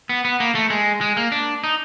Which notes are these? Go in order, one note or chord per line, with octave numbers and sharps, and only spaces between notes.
B3
B3
A#3
A3
G#3
G#3
A#3
D4
D#4